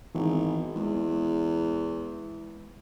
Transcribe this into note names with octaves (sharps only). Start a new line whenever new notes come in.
G#1 E3 B3 D#4
E2 G#3